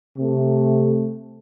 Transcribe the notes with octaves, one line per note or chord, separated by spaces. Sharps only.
C3 A3